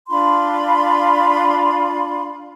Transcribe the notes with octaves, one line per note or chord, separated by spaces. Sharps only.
D4 F4 B5 C6